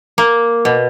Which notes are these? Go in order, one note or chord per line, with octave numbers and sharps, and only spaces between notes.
A#3
B2